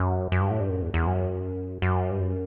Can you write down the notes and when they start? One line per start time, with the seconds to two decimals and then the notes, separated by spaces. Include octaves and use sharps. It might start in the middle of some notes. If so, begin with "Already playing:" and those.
Already playing: F#2
0.32 F#2
0.41 G2
0.51 A2
0.60 G2
0.69 F#2
0.82 E2
0.94 E2
1.07 F#2
1.82 F#2
2.11 G2
2.20 F#2